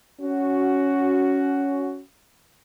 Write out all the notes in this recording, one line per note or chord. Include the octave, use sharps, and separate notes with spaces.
C#4 F#4